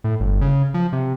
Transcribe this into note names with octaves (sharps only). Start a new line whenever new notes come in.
A2
G1
C#3
F3
C3